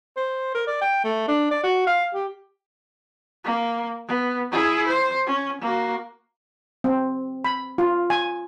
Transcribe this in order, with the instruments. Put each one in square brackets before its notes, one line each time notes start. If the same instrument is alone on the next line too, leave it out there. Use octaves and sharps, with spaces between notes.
[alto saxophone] C5
A#4
D5
G5
A3
D4
D5
F#4
F5
G4
[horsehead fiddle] A#3
B3
E4 G#4
C5
C#4
A#3 F#4
[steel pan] C4
B5
F4
G#5